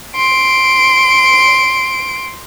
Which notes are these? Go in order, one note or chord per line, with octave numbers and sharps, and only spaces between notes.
C6 D7